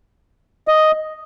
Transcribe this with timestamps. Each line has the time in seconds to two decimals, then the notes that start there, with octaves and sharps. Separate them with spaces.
0.68 D#5